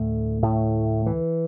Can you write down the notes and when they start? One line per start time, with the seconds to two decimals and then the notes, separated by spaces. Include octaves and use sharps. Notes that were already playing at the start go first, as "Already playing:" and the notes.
Already playing: D2 A2 D3 A3
0.43 A2 A3
1.06 E3